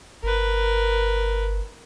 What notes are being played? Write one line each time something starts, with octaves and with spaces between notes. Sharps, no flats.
G1 A#4 B4